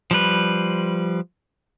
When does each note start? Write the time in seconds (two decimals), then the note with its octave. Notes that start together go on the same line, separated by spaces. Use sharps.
0.11 F3 G3 B4